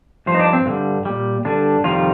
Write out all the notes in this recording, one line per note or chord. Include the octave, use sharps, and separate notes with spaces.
G2 F3 C5
D#4
D4
C4
G2 D3 G3
A#2 G3
G2 D3 G3 D4
F2 C3 D#3 G3 F4